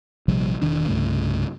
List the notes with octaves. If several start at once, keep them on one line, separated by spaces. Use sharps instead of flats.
A#1 C3 F3 G3
E1 D#3 D4
C2 G2 C#3 A3